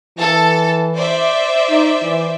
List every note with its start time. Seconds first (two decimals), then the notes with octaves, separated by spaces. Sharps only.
0.18 E3 A4 A5
0.95 C5 D5 E5
1.69 D#4
2.02 E3